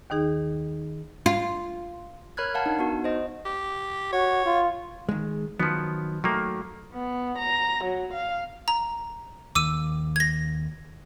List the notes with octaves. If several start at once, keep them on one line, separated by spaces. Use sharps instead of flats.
D#2 D#3 D#4 G#4
F4
A#4 C#5 B5 F6 F#6 G#6
A#4 F5 F#5 A5
D4 D#4
B3 D#4 F#4
C5 D#5
G4
F#4 C#5
F4
D#3 G#3
D#3 F3 F#3 B3
D#3 F#3 A3 A#3
B3
A#5
F#3
F5
A#5
D#2 D#3 D6 E6 D#7
G#6 A#6